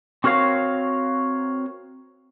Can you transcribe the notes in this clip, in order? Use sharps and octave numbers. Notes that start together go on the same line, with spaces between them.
C4 F#4 A#4 C#5 F5